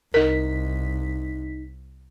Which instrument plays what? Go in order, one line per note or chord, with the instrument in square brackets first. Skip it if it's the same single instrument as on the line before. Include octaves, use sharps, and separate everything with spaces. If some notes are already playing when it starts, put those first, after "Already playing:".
[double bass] C2 [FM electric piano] D#4 B6 [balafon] A#4